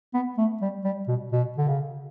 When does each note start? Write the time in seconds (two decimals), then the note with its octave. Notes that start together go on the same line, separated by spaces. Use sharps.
0.14 B3
0.37 A3
0.61 G3
0.84 G3
1.08 B2
1.32 B2
1.57 D3
1.68 C#3